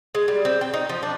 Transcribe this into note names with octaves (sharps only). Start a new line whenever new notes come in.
G#3
G3
C4
G5
D#4
F3
D4